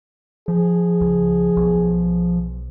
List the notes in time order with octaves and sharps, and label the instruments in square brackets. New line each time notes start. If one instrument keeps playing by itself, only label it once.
[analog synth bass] F3 [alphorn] G#4
[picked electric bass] C#2
B1